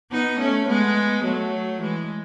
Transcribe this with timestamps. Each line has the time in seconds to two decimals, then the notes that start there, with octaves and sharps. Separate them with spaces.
0.11 B3 D#4
0.39 A3 C#4
0.67 G#3 B3
1.24 F#3 A3
1.81 E3 G#3